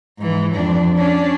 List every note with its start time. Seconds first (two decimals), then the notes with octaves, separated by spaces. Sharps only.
0.18 G#2 E3
0.53 F2 D4
0.97 C#4 D4